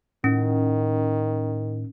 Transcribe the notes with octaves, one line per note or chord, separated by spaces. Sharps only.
A2 D#3 C#4